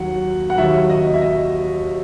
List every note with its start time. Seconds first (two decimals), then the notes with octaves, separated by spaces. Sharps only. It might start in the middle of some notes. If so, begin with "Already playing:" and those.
Already playing: D#2 D#3 F#3 F#5
0.50 F#5
0.58 D#2 D#3 F#3 E5
0.90 D#5
1.14 E5
1.21 D#5